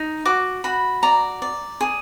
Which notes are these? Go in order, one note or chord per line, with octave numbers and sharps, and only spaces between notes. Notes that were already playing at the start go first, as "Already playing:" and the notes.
Already playing: D#4
F#4 D6
F#4 B5
D5 A#5
D5
G#4